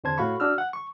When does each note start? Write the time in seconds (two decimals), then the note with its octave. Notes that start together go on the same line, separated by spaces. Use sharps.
0.04 E2 D3 C4 C5 A5 G#6
0.18 A2 F#4 F5 B5 C#6
0.40 D4 F#4 E6 F6
0.58 F#5
0.73 C#6